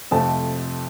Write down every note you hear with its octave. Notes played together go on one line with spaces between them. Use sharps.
F2 C3 F3 A3 A5